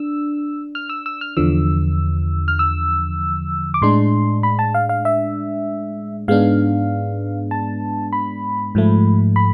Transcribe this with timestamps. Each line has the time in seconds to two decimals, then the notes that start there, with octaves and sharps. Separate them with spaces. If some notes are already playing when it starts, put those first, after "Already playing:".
Already playing: D4 E6
0.75 F6
0.90 E6
1.06 E6
1.21 F6
1.37 E2 D3 F3 E6
2.48 F6
2.59 E6
3.74 D6
3.82 A2 G#3 D4 C6
4.43 B5
4.59 A5
4.74 F5
4.89 F5
5.05 E5
6.28 G#2 G#3 B3 D4 F5
7.51 A5
8.13 B5
8.75 G#2 F3 A3
9.36 B5